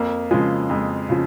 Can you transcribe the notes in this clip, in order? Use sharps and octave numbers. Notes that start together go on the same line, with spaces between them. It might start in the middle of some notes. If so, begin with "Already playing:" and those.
Already playing: F2 A#3
C#3 F3 G#3
F2 G#3
C#3 F3